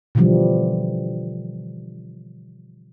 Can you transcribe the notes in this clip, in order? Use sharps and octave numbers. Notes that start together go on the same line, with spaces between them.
B2 D3 E3 F3 G3